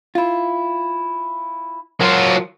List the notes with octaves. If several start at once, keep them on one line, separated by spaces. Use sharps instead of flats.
E4 F4
F#3 F4 A#4 C6